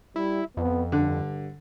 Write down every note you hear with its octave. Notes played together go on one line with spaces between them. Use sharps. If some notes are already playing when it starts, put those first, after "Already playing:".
G3 E4
F2 B3
G2 D3